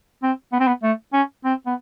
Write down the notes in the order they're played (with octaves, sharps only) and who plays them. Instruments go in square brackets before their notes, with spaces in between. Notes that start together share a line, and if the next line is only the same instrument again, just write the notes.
[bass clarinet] C4
B3
C4
B3
A3
C#4
C4
B3